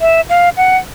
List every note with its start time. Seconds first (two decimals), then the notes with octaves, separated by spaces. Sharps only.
0.01 E5
0.29 F5
0.57 F#5